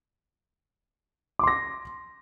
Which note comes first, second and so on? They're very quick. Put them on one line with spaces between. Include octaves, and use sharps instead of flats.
D6 C6 A#6